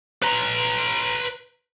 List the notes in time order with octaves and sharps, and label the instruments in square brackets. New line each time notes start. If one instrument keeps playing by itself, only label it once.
[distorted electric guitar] B4 A#5